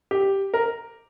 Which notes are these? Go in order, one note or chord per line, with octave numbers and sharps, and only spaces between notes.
G4
A#4